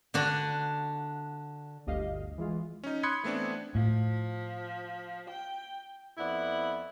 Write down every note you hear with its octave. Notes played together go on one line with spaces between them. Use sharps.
D3 D4 F#4
G1 D2 D3 G4 D#5 F5
E3 G#3 F4
C#4 D#4
B5 C6 D#6 F#6 G#6 C#7
E3 A3 B3 C4 D4
A2 F3
G5
F2 B3 E4 D5 F#5